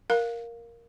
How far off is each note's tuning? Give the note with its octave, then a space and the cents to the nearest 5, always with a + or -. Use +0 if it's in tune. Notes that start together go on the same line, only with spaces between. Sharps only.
A#4 +0 F5 +5